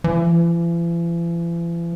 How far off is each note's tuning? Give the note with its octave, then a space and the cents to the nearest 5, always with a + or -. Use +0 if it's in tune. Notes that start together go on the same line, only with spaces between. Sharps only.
E3 +45